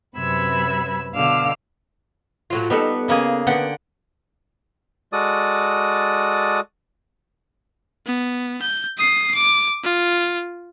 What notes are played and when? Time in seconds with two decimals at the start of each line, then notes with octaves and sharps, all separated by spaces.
0.16 F#2 C3 B4 B5 E6 G#6
1.14 B2 D3 F5 D6 E6 F6
2.50 A2 F#3 F4
2.70 G3 B3 D#4 A4
3.08 C#3 A#3 G#4
3.47 D3 B3 F#5 G5
5.13 G#3 F#4 A4 D5 D#6
8.06 B3
8.62 G6
8.97 D#6 C7
9.35 D6
9.83 F4